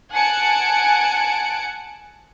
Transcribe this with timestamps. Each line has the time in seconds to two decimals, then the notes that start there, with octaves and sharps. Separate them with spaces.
0.12 F#5 G#5 A5 F#6 C#7 D7